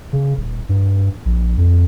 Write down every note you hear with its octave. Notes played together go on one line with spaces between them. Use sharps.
C#3
D#1
G2
A#1
F2